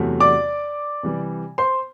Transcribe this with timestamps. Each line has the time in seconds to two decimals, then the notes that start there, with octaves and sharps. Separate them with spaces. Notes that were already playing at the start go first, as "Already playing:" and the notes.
Already playing: E2 C3 F#3 A3
0.20 D5 D6
1.03 C3 E3 G3
1.58 C5 C6